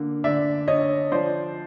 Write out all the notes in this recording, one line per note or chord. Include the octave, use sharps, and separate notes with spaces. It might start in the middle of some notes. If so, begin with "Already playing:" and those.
Already playing: D3 A#3
D3 D5 E5
D3 C#5 D#5
F3 C5 D5